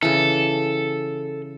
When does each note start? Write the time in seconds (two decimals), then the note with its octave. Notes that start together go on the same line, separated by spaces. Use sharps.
0.03 C#3 E3 A4